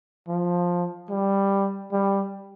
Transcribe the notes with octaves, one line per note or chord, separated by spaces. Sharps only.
F3
G3
G3